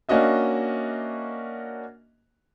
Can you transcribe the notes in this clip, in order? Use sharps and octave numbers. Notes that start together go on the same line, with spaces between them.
A#3 C#4 D4 F#4 D#5 E5